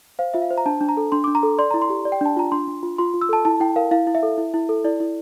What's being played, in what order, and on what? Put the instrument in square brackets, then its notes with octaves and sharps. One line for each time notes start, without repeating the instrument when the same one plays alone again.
[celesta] C5 F5
F4 E5
F5
C5
A#5
D4 A5
D4
A#5
A4
D4 C6
D6
D4
A#5
A4
D5 C6
E4 A#5
C6
G4
D5
G5
D4 A5
F4 A#5
D4 C6
D4
F4
F4 C6
F4
E6
A4 A5
E4 A5
E4 G5
A#4 F5
E4 F5
E4
E5
A4
E4
E4
A4
E4 D5
E4